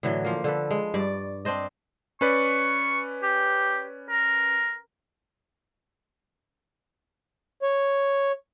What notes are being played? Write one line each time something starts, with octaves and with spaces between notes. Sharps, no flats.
A2 D3 E3 F#3
F3 A#3
D3 A4 B4
G#3
G2 D5
C4 D4 C5 D#5
C#4 B4 D5 C#6
G4
A#4
C#5